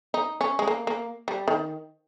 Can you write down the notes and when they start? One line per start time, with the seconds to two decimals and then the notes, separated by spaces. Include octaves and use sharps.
0.14 D#4
0.41 C#4
0.59 G#3
0.67 A#3
0.87 A#3
1.28 G3
1.48 D#3